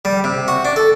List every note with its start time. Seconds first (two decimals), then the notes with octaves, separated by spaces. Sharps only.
0.05 G3
0.24 C3
0.48 F#4
0.65 D4
0.76 A4